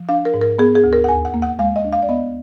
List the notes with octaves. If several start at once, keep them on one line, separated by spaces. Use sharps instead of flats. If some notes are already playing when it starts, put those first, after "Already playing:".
Already playing: F3
D4 F5
A#4
G#2
A#4
B3 G#4
G#4
D2
A#4
F#5
D#2 G#5
F#5
A#3
F#5
G#3 F5
D#5
D4
F5
D5
B3 D#5